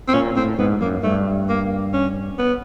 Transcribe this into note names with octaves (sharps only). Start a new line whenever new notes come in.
C4
A#2 C#4
A2 C4
G#2 B3
F#2 A#3
G2 A3
A#3
C#4
B3